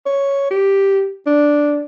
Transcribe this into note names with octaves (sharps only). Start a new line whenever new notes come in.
C#5
G4
D4